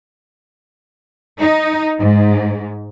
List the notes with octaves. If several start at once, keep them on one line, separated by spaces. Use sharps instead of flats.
D#4
G#2